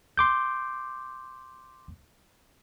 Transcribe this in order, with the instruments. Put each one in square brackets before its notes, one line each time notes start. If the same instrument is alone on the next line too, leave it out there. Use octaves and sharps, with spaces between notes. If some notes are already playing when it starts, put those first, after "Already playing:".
[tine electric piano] C6 D6 G6